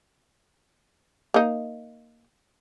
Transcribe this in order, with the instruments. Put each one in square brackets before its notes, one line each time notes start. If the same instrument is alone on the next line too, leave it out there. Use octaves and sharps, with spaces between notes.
[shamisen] A#3 D#4